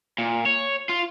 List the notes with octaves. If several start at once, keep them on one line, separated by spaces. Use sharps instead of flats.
A#2
C#5
F4